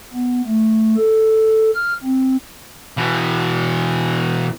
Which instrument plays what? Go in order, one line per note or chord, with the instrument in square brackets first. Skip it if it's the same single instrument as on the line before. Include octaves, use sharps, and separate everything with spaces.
[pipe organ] B3
A3
A4
F6
C4
[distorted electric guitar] B2 E3